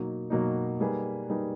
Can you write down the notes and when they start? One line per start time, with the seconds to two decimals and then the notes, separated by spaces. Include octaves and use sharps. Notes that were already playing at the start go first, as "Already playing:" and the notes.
Already playing: B2 F#3 A#3 D#4
0.30 B2 F#3 A#3 D#4
0.80 G3 A#3 D#4 G#4 B4
1.30 G3 A#3 D#4 G#4 B4